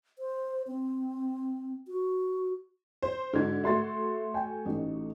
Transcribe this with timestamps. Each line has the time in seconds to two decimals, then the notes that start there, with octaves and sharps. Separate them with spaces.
0.19 C5
0.68 C4
1.88 F#4
3.02 C5
3.33 G#2 D3 F#4 G#6
3.63 A3 F#4 E5 C6 A6
4.34 G5 G#5
4.65 A1 D#4